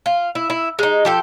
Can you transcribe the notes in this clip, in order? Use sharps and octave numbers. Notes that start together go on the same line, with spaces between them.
F4
E4
E4
G#3 D#4
F3 G4 A4